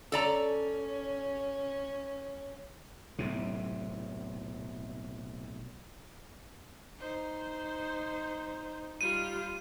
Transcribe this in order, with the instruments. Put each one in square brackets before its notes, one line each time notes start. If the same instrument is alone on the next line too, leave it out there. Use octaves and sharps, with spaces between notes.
[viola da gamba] C#4 [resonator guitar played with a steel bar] A4 D5 A#5
[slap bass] B1 A2 C3
[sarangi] D#4 [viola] C5
[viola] G3 F4 [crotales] D#7